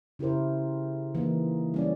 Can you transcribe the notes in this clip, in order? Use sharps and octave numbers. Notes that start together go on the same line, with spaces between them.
C#3 E4 G4 A#4 C5
E3 A#3 D#4
G3 C#4 D5